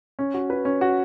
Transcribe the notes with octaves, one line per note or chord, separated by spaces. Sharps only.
C#4
F#4
B4
C#4
F#4